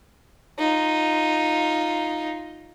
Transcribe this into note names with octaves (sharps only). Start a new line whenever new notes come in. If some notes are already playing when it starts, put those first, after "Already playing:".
D#4 F4